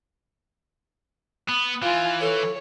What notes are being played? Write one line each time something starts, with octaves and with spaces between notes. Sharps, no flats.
B3
E3 F4 G#5
A4 C#5